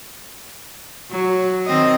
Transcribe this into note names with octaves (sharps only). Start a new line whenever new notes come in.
F#3
D#3 C4 D#5